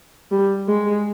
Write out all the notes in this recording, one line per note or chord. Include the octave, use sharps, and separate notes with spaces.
G3
G#3